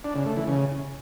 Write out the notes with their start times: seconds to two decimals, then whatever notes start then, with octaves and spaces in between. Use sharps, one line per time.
0.04 D4
0.15 C#3
0.26 A3
0.37 E3
0.47 C#3